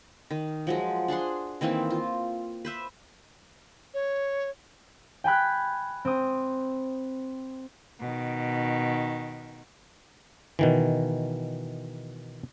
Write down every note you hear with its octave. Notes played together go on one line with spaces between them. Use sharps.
D#3
F3 F#3 G#3
D4 G#4 F#5 C6
D#3 E3 A#3 C4
F4
B4 C5 E5
C#5
G5 G#5 B5 F#6
C4 D#6
B2 D#3
B2 D#3 E3